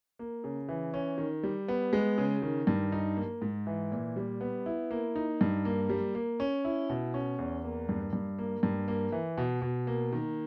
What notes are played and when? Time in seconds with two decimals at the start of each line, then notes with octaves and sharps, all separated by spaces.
0.19 A#3
0.44 C#3
0.69 E3
0.94 C#4
1.18 D#3
1.43 G3
1.68 B3
1.93 G#3
2.18 C#3
2.42 D#3
2.67 G2
2.92 D#4
3.17 A#3
3.42 G#2
3.67 E3
3.92 A#2
4.16 G3
4.41 B3
4.66 E4
4.91 A#3
5.16 D#4
5.41 G2
5.65 A#3
5.89 G3
6.15 A#3
6.40 C#4
6.65 E4
6.90 B2
7.14 C#4
7.38 E2
7.64 A#3
7.89 G2
8.13 G2
8.39 A#3
8.63 G2
8.88 A#3
9.12 E3
9.38 B2
9.62 B2
9.87 A#3
10.12 D#3